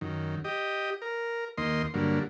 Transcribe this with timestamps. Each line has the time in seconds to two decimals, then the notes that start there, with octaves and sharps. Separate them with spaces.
0.01 F#2 D#3
0.44 G4 D#5
1.02 A#4
1.57 D#2 A#3 D#5 C6
1.94 G2 D3 F#3 A#3